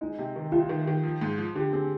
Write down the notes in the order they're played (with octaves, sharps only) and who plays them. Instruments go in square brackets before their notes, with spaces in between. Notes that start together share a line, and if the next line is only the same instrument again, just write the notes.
[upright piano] G#3 [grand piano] D#4
[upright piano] C3
D#3
[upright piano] C2 [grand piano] F4
[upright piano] D#3
D#3
F3
G#2
F3
[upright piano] D3 [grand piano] G4
[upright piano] C4 [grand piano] G#4